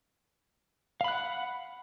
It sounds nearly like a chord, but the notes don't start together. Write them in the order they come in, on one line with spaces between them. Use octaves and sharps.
F5 B5 F#6 F#5